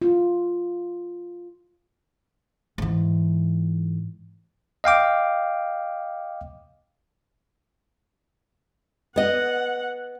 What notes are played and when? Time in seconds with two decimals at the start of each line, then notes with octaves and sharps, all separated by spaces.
0.02 F4
2.78 G#2 E3
4.84 D#5 F5 G5 D6
9.16 B3 D#5 F#5